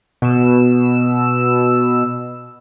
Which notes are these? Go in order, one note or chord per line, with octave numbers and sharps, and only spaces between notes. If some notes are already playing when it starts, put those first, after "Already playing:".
B2 E6